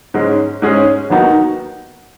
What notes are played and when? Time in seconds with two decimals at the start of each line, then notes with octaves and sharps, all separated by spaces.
0.14 G#2 G#3 C#4
0.62 G#2 G#3 C#4 G#4
1.10 D#2 D#3 B3 D#4 F#4